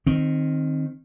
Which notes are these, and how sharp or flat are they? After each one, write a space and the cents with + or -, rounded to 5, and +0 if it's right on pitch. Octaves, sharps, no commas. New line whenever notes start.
D#3 -10 C4 +10